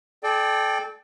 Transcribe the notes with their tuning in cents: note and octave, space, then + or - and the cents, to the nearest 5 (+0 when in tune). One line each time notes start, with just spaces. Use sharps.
A4 -30 D5 +20 G5 +0